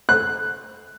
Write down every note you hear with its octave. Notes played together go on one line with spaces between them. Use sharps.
F#6